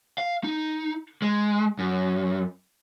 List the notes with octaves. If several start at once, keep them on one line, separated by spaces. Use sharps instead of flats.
F5
D#4
G#3
F#2